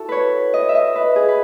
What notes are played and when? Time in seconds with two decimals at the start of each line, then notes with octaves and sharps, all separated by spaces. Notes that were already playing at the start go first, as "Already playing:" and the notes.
Already playing: E4 F#4 A4
0.09 B4 C#5
0.54 D#5
0.69 E5
0.75 D#5
0.95 B4
1.16 G#4
1.28 B4